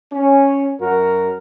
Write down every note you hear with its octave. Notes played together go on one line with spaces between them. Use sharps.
C#4
F#2 F#4 A#4